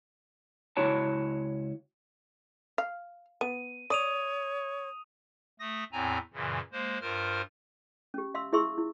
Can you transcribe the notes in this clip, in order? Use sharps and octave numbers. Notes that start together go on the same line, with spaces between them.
C#2 E4 F#4 C#5 A5
F5
B3 D#7
C#5 D5 D#6 D#7 F7
A3 D#6 A#6
E2 A2 C4 G#5 A#5
F#2 A#2 C#3 E3
G#3 A#3 C5
G2 F4 A#4 C5 F6
C#4 G4
E5 F5 C6 E6
E4 G#4 E5 C6 C#6 E6
E4